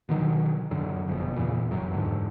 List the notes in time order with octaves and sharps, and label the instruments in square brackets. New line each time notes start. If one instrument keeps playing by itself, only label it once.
[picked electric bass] B2 D3 D#3 F#3
F#2 D3 F#3
F#1 F2 B2
E2 A#2 C#3 E3
F1 F#2 F#3
E2 G#2 D3